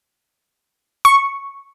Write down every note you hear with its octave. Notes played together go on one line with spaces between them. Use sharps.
C#6